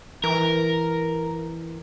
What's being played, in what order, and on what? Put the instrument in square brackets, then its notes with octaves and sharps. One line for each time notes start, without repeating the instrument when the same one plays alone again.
[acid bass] E3 [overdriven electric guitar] A#4